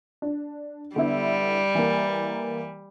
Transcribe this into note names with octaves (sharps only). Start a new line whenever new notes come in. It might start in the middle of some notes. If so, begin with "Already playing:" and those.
D4
D3 G3 B3 E4
E3 A#3